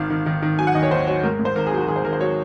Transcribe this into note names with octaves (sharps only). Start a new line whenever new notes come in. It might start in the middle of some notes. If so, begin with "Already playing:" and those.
Already playing: G#1 D#3 F5
D#3
D#3
D#3
F#3 G#5
F#5
D#2 D#5
C#5
D#2 C5
F#3 C#5
G#2 A#4
G#2
C5
G#1 A#4
G#4
F#3
F#4
G#1 G#4
C5
G#1 A#4
C5
F#3 C#5